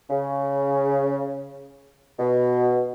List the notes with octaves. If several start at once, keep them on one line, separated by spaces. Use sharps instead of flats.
C#3
B2